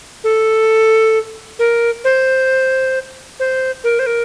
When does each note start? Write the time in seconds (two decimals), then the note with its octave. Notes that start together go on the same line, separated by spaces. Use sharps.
0.24 A4
1.59 A#4
2.04 C5
3.40 C5
3.84 A#4
3.99 C5
4.06 A#4